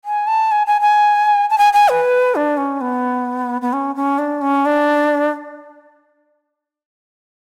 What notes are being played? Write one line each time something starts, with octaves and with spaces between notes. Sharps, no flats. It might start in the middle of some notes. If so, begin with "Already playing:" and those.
G#5
A5
G#5
G#5
G#5
A5
G#5
G#5
B4
D4
C#4
B3
B3
C#4
C#4
D4
C#4
D4